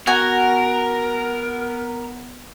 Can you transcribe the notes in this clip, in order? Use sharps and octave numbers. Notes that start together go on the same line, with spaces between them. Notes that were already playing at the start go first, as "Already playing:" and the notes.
B3 F#4 A#4 G#5